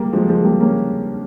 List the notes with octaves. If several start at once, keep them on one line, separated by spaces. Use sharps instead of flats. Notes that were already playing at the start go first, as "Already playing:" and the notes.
Already playing: G3 G#3 A#3
F3 G#3
F3 G#3
G3 A#3
A#3 C#4